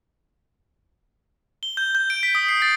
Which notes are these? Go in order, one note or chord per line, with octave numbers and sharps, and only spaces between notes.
G7
G6
G6
D7
B6
D#6
C7
A6